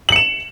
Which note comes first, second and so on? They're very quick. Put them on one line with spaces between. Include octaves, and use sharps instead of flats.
F#7 C#7 E7